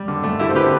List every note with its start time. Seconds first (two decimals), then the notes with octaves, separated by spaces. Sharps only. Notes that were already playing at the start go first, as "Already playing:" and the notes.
Already playing: G3
0.08 D3
0.24 A3
0.39 D3 E4 G4
0.49 C5
0.55 D3 G4 B4